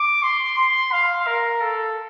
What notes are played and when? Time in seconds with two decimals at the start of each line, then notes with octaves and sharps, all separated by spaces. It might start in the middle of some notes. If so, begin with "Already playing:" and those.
Already playing: D6
0.23 C6
0.58 C6
0.92 F5
1.27 A#4
1.61 A4